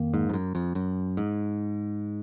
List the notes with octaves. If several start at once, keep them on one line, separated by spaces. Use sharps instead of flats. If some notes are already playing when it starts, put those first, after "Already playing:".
Already playing: F2 D#3 A#3
G#2
F2
F#2
F2
F#2
G#2